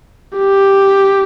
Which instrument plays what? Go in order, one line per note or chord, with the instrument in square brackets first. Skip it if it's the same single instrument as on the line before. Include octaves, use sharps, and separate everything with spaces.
[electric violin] G4